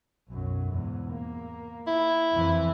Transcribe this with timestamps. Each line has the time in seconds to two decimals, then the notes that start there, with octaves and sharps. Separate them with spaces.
0.29 B1 F#2
0.72 E2 G#2
1.12 A#3
1.87 E4
2.33 F2 E3